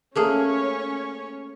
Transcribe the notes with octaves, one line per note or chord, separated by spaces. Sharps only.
A3 A#3 C#4 G#4 C#5